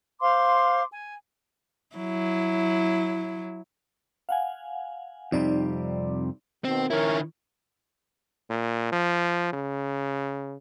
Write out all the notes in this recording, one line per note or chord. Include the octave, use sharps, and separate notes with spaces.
C5 F5 C6 D6
G#5
F#3 E4
F5 F#5 G#5
F2 C3 G3 D#4 D5
B2 D#3 C4
D#3 C#4 E4 A#4 C#5
A#2
F3
C#3